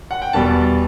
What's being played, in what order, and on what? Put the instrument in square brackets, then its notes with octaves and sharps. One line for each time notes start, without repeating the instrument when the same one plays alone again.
[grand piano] F#5
G5
E2 B2 G3 A5